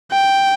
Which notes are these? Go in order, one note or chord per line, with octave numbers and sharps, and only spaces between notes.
G5